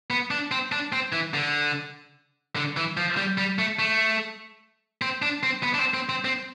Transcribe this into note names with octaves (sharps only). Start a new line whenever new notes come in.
B3
D4
C4
D4
C4
E3
D3
D3
E3
F3
G3
G3
A3
A3
C4
D4
C4
B3
D4
C4
C4
C4
C4